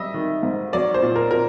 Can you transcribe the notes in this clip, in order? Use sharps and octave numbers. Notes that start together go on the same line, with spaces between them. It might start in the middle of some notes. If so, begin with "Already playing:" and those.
Already playing: G3 D#5 E5
D#3
G#2
F#3 D5
C5
A#2
A#4
A#2 A#4